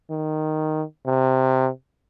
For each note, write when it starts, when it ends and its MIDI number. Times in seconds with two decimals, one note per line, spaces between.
0.10 0.84 51
1.06 1.69 48